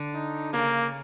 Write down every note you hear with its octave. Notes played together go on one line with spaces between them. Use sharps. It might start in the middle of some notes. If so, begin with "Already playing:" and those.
Already playing: D3 D4
D#4
C#3 A#3 C#4